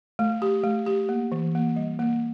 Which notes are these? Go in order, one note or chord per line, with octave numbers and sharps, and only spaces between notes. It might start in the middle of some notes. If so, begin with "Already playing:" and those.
A3
G4
A3
G4
A#3
E3
A#3
G3
A#3